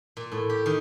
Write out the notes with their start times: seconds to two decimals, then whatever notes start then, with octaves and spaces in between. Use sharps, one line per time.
0.17 A#2
0.32 A2
0.49 G4
0.66 D#3